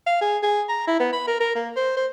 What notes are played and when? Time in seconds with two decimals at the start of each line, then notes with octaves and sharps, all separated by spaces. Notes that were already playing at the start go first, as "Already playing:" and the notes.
0.07 F5
0.21 G#4
0.43 G#4
0.69 A#5
0.87 E4
1.00 B3
1.13 B5
1.27 A#4
1.41 A#4
1.55 A#3
1.76 C5
1.97 C5